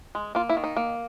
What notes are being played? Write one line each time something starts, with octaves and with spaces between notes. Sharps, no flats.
G#3
A#3 F4
E4
D#3
D#4
A#3